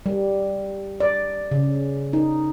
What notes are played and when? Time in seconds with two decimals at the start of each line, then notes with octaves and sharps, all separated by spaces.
0.06 G3
1.00 D5
1.51 C#3
2.13 D#4